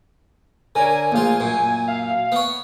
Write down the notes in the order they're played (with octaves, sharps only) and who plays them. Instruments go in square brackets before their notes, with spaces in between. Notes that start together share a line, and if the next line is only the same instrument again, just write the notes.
[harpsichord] D3 [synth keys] A#4 C#5 [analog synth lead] G#5
[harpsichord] A#1 F4 [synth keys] A3 A#3 F5
[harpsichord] F#2 A#2
[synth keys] E5 G#5 [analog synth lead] F5
[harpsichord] B3 C#5